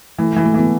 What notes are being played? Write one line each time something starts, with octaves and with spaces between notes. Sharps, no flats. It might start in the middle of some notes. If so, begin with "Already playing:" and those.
E3 A3
E3 G#3
A3
E3 B3